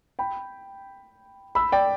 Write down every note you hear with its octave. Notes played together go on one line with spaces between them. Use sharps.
G5 B5
B5 E6
D5 G5